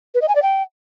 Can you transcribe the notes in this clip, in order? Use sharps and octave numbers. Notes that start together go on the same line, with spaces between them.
B4
D#5
G#5
D5
G5